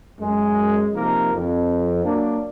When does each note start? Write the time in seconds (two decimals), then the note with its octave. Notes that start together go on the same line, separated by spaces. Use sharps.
0.20 F#2 G#3
0.94 C3 F3 A#3 D#4 A#4
1.34 F2
2.04 F#3 A#3 D4